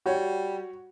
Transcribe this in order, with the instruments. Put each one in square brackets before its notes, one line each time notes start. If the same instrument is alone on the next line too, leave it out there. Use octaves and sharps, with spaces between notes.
[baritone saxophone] G3 [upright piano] F#4 C#5